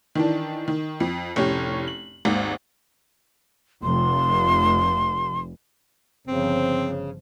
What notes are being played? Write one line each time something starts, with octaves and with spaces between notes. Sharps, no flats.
D#3 E3 D4
D#3
F2
F1 A2 C#4 G4
F#7
G#1 D#2 G#2
F1 C6
G1 C#3 F3 C4